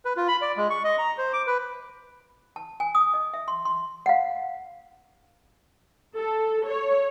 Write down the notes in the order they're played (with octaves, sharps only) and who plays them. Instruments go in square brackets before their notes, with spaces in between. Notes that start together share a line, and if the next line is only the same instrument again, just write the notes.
[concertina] B4
F4
B5
D5
G#3
C#6
D#5
A#5
C5
D6
B4
[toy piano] A5
G#5
D#6
D#5
E5
C6
C6
F5 F#5
[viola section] A4
C#5